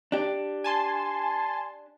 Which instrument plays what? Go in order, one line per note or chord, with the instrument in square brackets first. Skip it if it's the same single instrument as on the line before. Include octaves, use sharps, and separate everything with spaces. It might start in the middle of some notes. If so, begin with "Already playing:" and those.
[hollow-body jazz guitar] D4 G4
[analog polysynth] G#5 A5 C6